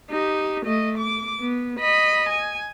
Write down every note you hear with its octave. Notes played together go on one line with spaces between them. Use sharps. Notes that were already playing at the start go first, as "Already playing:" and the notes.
D#4 G4
A3 D#5
D6
B3
D#5 B5
G#5